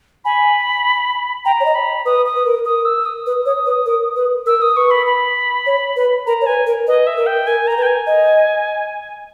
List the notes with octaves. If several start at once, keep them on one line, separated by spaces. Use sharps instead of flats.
G#5 B5
G5 A#5
C#5
D#5
B5
B4 D#6
D#6
B4
A#4
A#4 D#6
E6
D#6
B4
C#5
B4
A#4
B4
A#4 E6
D#6
B4 C#6
B5
B5
C#5
B4
A#4 A#5
C#5
B4 G#5
A#4
B4 D#5
E5
A#4
G5
A#4 G#5
A#4 A#5
B4
G5
G#5
D#5